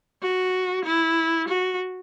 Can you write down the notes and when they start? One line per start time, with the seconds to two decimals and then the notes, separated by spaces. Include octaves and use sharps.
0.22 F#4
0.85 E4
1.48 F#4